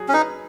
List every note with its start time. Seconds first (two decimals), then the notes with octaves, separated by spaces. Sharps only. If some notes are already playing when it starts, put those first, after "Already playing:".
Already playing: F#3 G#4
0.08 C#4
0.14 D#4 B4